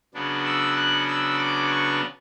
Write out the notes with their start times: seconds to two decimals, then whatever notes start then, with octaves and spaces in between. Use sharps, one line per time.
0.14 C#3 F#3 B3 D4
0.46 E6
0.76 F#6
1.08 E6
1.38 D6
1.71 C#6